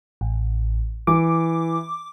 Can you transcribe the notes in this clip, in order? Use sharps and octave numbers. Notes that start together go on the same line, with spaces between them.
A1
E3 D6